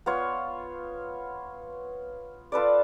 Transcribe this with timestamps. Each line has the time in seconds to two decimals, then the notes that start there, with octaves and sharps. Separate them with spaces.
0.06 B3 F4 C#5
2.52 F4 A4 B4 D5